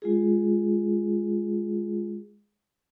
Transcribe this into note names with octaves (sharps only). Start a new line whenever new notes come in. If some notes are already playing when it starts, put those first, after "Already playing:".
G#3 F4 G#4